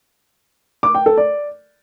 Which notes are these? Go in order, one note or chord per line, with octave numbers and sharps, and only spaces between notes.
D6
G5
A4
D5